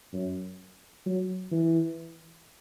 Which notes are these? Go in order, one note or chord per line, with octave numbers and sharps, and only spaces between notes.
F#2
F#3
E3